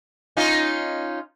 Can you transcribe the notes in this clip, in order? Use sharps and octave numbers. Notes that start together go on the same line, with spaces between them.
C#4 D#4 F4